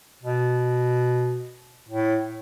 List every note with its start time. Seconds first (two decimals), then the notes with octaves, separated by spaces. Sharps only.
0.23 B2
1.88 A2